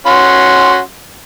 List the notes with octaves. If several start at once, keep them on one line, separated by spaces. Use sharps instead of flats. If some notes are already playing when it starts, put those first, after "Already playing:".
C#4 F#4 C6